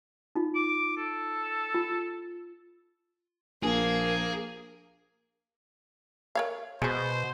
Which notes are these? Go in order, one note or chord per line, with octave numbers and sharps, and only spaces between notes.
D#4 F4
D6
A4
F4
A#1 A#3 G#4
A#4 C#5 F5
B2 G#3 F#4 C5